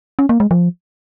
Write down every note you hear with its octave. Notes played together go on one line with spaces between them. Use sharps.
C#4
A#3
G#3
F3